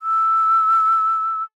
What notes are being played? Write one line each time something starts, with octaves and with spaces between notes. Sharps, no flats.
E6